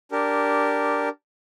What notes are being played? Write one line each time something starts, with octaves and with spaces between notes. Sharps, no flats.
D4 G4 A#4